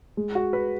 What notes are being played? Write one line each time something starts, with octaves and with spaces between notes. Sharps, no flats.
G#3
F#4
B4